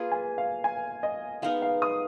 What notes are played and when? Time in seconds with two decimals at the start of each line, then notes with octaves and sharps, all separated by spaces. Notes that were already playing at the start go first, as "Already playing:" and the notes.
Already playing: A#3 F4 G#4 B4
0.12 G#5
0.38 F5
0.64 G#5
1.03 D#5
1.42 G#3 B3 D#4 A#4 F5
1.62 F5
1.82 D#6